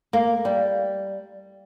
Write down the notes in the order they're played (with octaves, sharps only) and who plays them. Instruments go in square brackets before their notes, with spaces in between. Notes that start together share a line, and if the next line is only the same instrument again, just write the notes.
[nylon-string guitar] A#3
G3